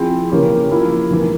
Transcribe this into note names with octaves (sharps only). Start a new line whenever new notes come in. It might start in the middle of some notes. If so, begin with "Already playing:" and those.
Already playing: F3 C4 E4 G#4
C#3 E3 A#3 C#4 G4
F3 A#3 E4 A#4
E2 E3 A#3